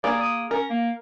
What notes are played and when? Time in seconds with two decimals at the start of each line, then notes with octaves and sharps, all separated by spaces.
0.04 A#3 G#4 D5
0.20 D#6
0.51 C#4 A#4
0.70 A#3